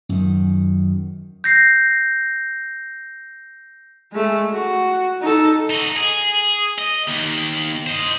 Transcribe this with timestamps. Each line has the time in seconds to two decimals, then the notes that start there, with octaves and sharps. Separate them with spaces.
0.09 F#2 D#3
1.44 G6 A#6 C7
4.13 G#3 A3
4.53 F#4
5.21 D#4 A4
5.70 D#4 F#4
5.97 G#4
6.79 D#5
7.08 D#2
7.87 C5 D#5